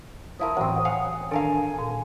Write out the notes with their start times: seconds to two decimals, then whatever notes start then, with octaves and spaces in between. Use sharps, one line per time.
0.40 F3 E4 A#4 D#6
0.57 A2 E3 F#3 C4
0.85 F5 F#5 G#5
1.31 D#3 D4 A4 A#4 F5 G#5
1.79 A#2